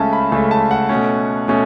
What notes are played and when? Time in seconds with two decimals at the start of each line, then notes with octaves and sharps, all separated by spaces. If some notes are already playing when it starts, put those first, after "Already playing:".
Already playing: C#2 C#3 A3 C#4 E5 A5
0.13 B5
0.32 C#2 C#3 A3 C#4
0.51 A5
0.71 F#5
0.89 B2 A3 C#4
1.48 B2 A3 C#4